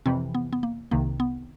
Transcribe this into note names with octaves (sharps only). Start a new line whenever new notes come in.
F2 C3 E3 C4
B3
B3
A#3
C2 C3 D#3 A#3
B3